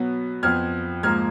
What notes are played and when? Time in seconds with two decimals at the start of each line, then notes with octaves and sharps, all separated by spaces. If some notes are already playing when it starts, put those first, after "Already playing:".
Already playing: B2 F#3 B3
0.43 F2 F3 B3 F6 G#6
1.03 G#2 F3 A#3 F6 G#6